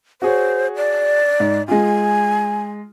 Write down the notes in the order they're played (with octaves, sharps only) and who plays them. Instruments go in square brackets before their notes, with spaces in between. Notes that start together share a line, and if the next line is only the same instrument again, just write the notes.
[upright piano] F#4 G#4 C#5 [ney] C5
[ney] D5
[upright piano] G#2
[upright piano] G#3 F4 [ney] G#5